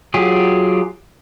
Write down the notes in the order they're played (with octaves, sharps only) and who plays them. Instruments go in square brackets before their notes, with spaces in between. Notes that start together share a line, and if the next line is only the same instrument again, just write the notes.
[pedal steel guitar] F#3 F4 G4 G#4